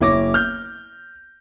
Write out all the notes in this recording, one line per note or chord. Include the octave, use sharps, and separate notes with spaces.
F#1 E4 C#5 D6 A#6
F6 G6